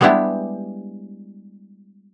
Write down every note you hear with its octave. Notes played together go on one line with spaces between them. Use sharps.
G3 G#3 B3 D4 E4 G4